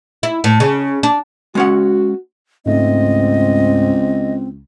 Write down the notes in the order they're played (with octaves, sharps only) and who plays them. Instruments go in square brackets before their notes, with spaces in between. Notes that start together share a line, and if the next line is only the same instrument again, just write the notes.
[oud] E4
A2
C#3
D4
[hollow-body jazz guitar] G#3 C#4 F#5 [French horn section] F#4
[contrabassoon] C#2 [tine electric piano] G#2 A3 [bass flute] C4 [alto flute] D#5